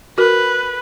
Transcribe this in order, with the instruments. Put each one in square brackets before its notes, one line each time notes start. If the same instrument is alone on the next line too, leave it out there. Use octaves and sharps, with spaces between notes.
[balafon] F#4 A#4 [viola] B4